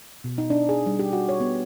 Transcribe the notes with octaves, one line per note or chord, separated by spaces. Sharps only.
B2
D#4
D4
G#4
G3
G4
F#4
C#5
B3